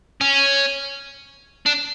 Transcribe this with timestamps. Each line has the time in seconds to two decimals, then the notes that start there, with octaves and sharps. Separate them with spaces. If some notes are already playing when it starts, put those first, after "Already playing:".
0.21 C#4
1.66 D4